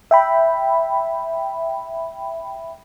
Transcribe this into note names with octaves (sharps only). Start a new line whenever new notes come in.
E5 G5 B5